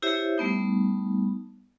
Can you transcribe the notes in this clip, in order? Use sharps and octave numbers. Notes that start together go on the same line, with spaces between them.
E4 G4 C5 C#5 E5
G3 A3 B3 D#4